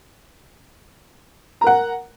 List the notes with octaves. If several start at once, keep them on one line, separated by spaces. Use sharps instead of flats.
A#4 F#5 A#5